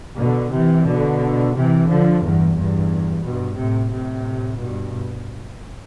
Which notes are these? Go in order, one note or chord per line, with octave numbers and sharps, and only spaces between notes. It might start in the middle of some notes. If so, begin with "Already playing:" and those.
B2 D3
C3 E3
B2 D3
C3 E3
D3 F3
E2 G2
E2 G2
G2 B2
A2 C3
A2 C3
G2 B2